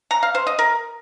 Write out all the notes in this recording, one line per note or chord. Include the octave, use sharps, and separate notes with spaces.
A#5
F5
C5
D#5
A#4